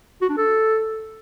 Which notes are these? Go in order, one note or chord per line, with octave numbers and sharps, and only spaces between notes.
F#4
D4
A4